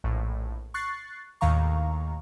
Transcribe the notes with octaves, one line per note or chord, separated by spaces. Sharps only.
A#1 A2
C#6 F#6 A6 C7
D#2 A2 D#3 F5 A#5 C#6